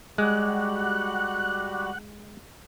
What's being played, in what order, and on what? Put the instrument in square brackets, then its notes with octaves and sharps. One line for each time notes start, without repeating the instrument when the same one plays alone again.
[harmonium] G3 F#4 G4 [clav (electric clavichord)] G#3 [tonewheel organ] F#5 F#6